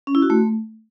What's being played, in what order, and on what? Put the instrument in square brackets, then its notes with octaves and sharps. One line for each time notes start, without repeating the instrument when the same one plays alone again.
[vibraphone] C#4
E4
F#4
A3